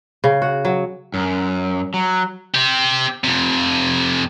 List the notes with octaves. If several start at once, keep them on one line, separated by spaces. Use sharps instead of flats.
C#3
F#4
F#3
F#2
F#3
C4 G4
F2 C3